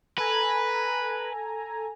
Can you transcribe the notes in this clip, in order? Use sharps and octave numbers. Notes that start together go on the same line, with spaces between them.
A4 B4 G#5 A#5